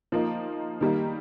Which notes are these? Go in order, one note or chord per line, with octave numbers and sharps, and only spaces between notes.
F3 A#3 D#4
D#3 G3 A#3 D#4